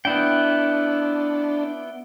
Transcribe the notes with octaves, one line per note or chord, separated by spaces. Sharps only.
B3 D4 E4 G5